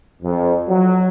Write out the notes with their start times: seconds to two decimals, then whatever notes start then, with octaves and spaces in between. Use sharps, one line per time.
0.22 F2
0.68 F#3